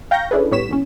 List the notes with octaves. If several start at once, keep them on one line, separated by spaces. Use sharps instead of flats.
F5 G5 A#5 C#6 G6 A#6
C#4 D4 E4 G#4 A4 B4
A2 G3 B3 C#5 B6 E7
A#1 E2 C#4